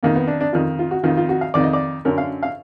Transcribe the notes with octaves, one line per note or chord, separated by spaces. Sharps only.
F2 D#3 A#3
B3
D4
D4
F2 D#3 F4
F4
F#4
F2 D#3 F4
F4
F#4
F5
F2 D#3 D5
D#5
D5
F#2 D3 A#4
F5
F5